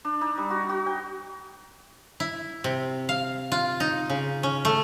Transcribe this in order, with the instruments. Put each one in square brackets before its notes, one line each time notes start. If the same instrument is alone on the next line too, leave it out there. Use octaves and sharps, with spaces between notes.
[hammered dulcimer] D4
D#4
G3
F#4
F#4
G5
[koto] E4
C3
F5
F4
D#4
C#3
C#4
A3